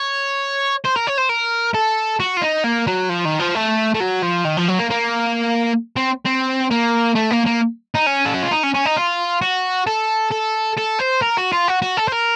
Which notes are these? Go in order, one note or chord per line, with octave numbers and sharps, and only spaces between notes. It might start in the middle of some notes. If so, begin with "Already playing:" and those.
Already playing: C#5
C5
A#4
C#5
C5
A#4
A4
F#4
F4
D#4
A#3
F#3
F3
D#3
F3
A3
A3
F#3
F3
D#3
F3
F#3
A#3
A#3
C4
C4
A#3
A3
A#3
A#3
D#4
C#4
A4
F#4
F4
D#4
C#4
C#4
D#4
F4
F#4
A4
A4
A4
C5
A#4
F#4
F4
F#4
F#4
A4
C5
A#4